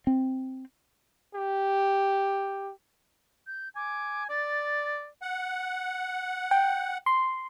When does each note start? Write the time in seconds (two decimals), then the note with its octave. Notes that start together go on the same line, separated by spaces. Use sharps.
0.07 C4
1.35 G4
3.47 G6
3.76 G#5 D6
4.29 D5 A6
5.22 F#5
6.51 G5
7.06 C6